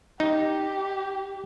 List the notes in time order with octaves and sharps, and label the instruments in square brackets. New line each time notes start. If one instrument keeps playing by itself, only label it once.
[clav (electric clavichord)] D#4 [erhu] G4